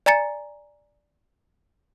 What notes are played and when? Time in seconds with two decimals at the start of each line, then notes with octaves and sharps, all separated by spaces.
0.06 D5 G#5 A#5 A6 C#7